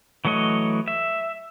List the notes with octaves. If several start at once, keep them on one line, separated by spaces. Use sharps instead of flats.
E3 F#3 A3 C#5 D#5
E5